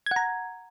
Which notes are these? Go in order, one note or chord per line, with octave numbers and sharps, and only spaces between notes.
F#5 A#5 G#6